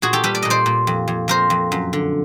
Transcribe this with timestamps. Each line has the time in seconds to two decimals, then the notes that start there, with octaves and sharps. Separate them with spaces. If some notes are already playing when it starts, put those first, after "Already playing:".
0.02 A#2 F#4 G#4
0.13 G4 A4
0.24 G3 A4 B4
0.35 D5
0.42 A#2 D#5
0.50 C5 D5
0.66 A#2
0.87 F2
1.08 F2
1.28 F2 A#4 C5
1.50 F2
1.72 F#2
1.93 D3